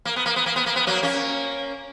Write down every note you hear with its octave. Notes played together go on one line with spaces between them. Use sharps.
A#3
B3
A#3
B3
A#3
B3
A#3
B3
F#3 A#3
A#3 C#4